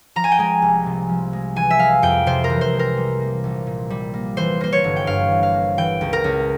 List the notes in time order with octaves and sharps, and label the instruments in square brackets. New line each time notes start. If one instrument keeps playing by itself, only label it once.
[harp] F3 A#5
G#5
G5
G#3 G#5
C2
C3
F3
G#3
E3 G#5
E5
G#3 F5
F2 G5
C3 C5
A#4
E3
C5
G#3
A#4
G3
A#3
A#1
A#2
G3
A#3
E3 C5
A#3 C5
C#5
G1
G5
G2 F5
E3
F5
A#3
E3 G5
C#2
A#4
C#2